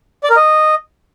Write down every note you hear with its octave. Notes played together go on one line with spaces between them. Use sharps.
D5
A#4
D#5